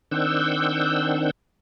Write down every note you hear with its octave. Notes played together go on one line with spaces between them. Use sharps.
D#3 C4 D4 F#5 E6 G6